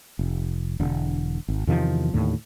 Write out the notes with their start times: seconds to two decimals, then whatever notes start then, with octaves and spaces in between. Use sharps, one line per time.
0.19 F1
0.80 E1 D3
1.48 G#1
1.67 E2 C3 D#3 F3
2.13 D#2 A2 D3